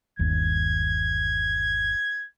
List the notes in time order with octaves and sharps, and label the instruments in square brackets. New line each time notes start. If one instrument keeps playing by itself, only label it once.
[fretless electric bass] G1 D#2 [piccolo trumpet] G#6